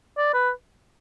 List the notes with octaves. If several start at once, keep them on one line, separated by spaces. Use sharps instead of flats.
D5
B4